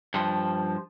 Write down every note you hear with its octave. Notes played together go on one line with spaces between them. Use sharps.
G2 F3